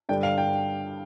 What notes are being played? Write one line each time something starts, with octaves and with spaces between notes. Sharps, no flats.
G2 D3 G3 D4 G5
F5
G5